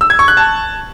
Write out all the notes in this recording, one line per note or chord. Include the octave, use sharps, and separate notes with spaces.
E6
G#6
C#6
F#6
A5